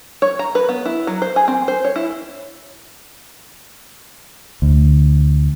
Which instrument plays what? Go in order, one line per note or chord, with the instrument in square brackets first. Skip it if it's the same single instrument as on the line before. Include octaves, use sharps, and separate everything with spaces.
[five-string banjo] C#5
A#5
B4
B3
E4
F#3
C5
G#4
C4
C5
C#5
E4
[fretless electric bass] D2